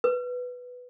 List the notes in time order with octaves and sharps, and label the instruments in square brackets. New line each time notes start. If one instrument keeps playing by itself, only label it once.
[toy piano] B4